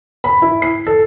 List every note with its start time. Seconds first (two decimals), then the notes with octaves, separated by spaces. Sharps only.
0.24 B5
0.42 E4
0.62 C7
0.87 A4